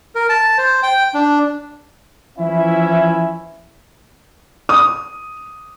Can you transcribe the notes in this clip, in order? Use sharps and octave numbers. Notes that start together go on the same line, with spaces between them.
A#4
A5
C5
G5
D4
E3 F3 C#4 E4 E5
D#6